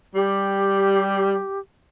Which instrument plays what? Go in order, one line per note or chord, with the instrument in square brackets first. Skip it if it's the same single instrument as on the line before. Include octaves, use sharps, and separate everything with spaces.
[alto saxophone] G3 [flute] G4